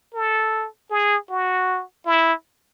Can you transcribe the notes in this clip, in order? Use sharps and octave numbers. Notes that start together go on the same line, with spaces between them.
A4
G#4
F#4
E4